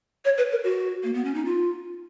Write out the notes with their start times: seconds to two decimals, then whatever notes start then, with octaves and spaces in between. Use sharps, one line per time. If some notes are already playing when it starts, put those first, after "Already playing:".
0.25 C#5
0.38 B4
0.52 A#4
0.64 F#4
1.04 A#3
1.14 B3
1.25 C#4
1.35 D#4
1.45 F4